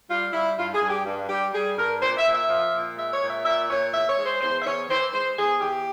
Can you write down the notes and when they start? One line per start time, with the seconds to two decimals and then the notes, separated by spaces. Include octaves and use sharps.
0.09 G3 F4
0.32 G3 E4
0.57 G2 F4
0.73 G#4
0.81 G2
0.89 G4
1.05 G2
1.28 G3 G4
1.53 G3 G#4
1.77 G2 A#4
2.01 A#2 C5
2.17 E5
2.25 A#2
2.33 E5
2.49 F3
2.73 A#2
2.97 G#3 E5
3.13 C#5
3.21 A#2
3.29 E5
3.45 A#2 E5
3.69 A#2 C#5
3.93 E2 E5
4.09 C#5
4.17 G#3
4.25 C5
4.41 E2 C5
4.61 E5
4.65 E2 C#5
4.89 E3 C5
5.13 G#3 C5
5.37 E2 G#4
5.61 E2 G4